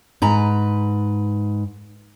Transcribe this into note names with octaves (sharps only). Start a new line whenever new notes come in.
G#2 B4 A#5